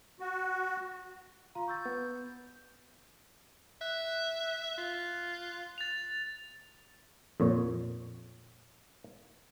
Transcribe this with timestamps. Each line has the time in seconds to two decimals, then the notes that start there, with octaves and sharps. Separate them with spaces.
0.20 F#4
1.55 F4 F5 A#5 C6
1.68 C#6 E6 G6 A6
1.86 B3
3.81 E5 F#6
4.78 F4
5.78 A6 F7
7.40 F2 A#2 C#5